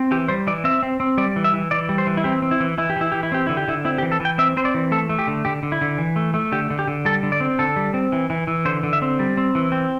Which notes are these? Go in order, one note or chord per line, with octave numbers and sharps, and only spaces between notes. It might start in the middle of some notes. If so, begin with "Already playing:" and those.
Already playing: C4
E3 G4
G3 C5
E3 D5
C4 E5
C4
C4
G3 D5
E3
E5
E3
E3 D5
G3
C5
E3
E4
C4 G4
C4
E4
E3
E3 E4
G4
E3 E4
E3 G4
E4
C4 G4
D3 E4
G4
D3 E4
C4 E4
G4
E3
A4
E3
G5
C4 E5
C4 C5
D5
E3
A3 A4
A3
G4
D3
D3 G4
D3
E4
D3
E3
A3
A3
D3 G4
D3
G4
D3
G3 A4
D3
D5
C4
D3 A4
G3
C4
E3
E3
E3
D3 C5
D3
E5
C4
G3
C4
E3
C4